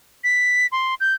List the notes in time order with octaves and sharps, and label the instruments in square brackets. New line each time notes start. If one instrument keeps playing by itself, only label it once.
[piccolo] B6
C6
G6